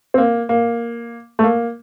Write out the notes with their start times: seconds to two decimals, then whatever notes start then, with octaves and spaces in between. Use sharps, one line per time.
0.14 C4
0.18 A#3
0.49 A#3
1.39 A3
1.43 A#3